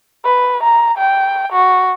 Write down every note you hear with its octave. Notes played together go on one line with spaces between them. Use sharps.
B4
A#5
G5
F#4